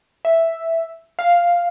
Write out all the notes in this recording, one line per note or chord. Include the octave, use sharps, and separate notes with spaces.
E5
F5